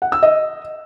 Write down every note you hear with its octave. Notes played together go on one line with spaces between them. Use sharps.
F#5
E6
D#5